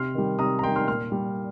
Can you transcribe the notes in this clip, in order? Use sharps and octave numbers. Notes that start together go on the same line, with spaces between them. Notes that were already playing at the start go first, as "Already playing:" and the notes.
Already playing: C3 C6 F6
D#3 G3
C3 A#5 D#6
A#5
D#3 G3 G5 C6
C6 F6
A#2 C6 F6
G3